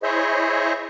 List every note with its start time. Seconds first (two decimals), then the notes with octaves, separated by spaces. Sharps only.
0.03 E4 G#4 C5 C#5 D#5 E5